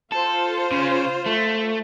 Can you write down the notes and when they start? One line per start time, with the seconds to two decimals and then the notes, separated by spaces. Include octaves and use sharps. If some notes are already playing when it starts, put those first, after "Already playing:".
0.12 F4 A4 C5
0.71 C#3
1.26 A3